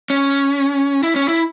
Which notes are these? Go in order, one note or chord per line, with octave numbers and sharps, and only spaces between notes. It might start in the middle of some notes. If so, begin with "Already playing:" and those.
C#4
E4
C#4
E4